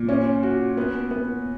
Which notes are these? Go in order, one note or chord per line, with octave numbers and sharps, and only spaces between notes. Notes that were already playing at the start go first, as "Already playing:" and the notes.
Already playing: A#2
C#4
F#4
B3
B3